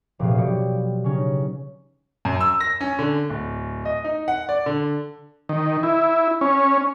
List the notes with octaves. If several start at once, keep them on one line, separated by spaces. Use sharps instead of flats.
F1 A#2 G4 G#4 B4 F5
B2 F#3 G4 D5 C#7
C#3 C#4 D#4
F#2
E6
A#6
C#4
D3
D1
D#5
D#4
F#5
D5
D3
D#3
E4
C#4